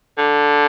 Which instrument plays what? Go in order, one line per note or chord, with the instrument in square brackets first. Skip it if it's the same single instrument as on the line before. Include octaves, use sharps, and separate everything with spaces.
[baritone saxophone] D3